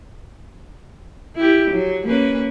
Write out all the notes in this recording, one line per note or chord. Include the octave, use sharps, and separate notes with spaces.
E4 G4
F#3
A#3 C#4 B4